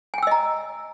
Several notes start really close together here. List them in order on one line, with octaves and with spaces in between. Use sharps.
G#5 G5 E6 D#5 A#5